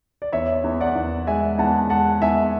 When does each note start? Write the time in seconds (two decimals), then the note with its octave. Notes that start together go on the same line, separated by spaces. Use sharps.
0.22 D5
0.32 E2 C#5 E5
0.64 E2
0.80 D5 F#5
0.96 E2
1.27 G#3 E5 G#5
1.58 E2 F#5 A5
1.90 G#3 F#5 A5
2.22 E2 E5 G#5